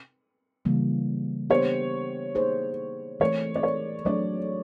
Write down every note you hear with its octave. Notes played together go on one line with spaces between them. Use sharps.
C#3 E3 G3 A#3
B3 D4 G4 C5 C#5
A#3 D#4 G#4 C5
E3 A3 C4 C#5
D5
C#5
F#3 A3 D4 D5